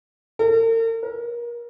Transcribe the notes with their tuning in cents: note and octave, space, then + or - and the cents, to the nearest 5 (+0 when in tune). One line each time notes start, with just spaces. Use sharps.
A#4 -45
A#4 +30